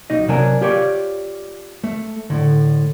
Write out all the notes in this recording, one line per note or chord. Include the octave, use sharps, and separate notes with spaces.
B1 D#4 D#5
C3 F#3 D4 A#4 G#5
F4 G4 C#5 D5
A3
A2 D3